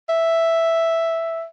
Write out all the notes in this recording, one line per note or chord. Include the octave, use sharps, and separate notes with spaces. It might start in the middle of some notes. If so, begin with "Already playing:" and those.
E5